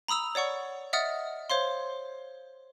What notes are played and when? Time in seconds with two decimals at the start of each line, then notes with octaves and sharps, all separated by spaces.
0.08 A#5 B5 D#6 E6 F7
0.35 C#5 D5 F#5 C#6
0.93 D#5 E5 F#5 D#6 F6 A6
1.50 C5 C#5 F5 C6